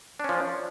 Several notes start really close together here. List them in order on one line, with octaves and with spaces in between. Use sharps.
D4 C#4 F3